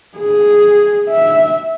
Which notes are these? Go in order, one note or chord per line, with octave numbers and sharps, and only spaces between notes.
G#4
E5